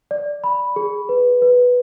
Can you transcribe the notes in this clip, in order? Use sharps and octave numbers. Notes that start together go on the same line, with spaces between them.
D5
B5
G#4
B4
B4